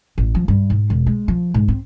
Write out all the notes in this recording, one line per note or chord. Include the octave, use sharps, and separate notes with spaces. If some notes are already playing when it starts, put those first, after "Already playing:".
A1
F3
G2
G#2
E1
G#3
F3
G#2
C4